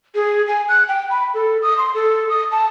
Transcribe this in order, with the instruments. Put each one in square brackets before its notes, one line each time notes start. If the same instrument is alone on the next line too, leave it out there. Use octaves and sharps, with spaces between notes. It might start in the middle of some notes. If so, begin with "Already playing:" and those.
[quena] G#4
G#5
F#6
G5
B5
A4
D#6
C6
A4
D#6
A5